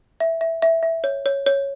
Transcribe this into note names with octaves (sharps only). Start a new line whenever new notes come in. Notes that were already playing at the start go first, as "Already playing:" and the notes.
E5
E5
E5
E5
C#5
C#5
C#5